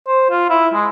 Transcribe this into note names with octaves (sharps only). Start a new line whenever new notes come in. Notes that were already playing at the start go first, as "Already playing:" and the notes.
C5
F4
E4
G#3